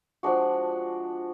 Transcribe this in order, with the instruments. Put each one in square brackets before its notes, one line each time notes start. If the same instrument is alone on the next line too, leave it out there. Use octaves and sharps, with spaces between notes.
[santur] F3 G#3 D4 F#4